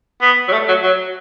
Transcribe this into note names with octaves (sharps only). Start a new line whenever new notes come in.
B3
F#3
A3
F#3
F#3